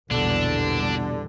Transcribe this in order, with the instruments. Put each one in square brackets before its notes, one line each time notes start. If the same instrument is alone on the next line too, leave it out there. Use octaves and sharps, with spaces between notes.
[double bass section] A#1 E2 G3 [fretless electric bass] B2 [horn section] D3 [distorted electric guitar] D4